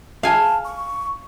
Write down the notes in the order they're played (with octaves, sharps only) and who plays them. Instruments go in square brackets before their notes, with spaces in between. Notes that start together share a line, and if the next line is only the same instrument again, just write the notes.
[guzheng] F5 G#5 [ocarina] A5
[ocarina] C#6